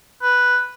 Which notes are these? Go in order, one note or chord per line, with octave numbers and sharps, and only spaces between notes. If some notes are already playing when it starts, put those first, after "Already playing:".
B4